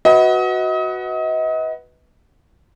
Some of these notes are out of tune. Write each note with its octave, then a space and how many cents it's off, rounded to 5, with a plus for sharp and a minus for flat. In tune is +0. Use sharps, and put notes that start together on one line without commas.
F#4 +0 B4 +0 D#5 +35